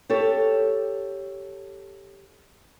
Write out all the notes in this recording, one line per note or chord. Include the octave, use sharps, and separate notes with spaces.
G4 A4 C#5